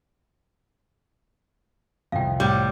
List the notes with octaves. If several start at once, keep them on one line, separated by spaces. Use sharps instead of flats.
C2 F2 F5 G5
A2 G3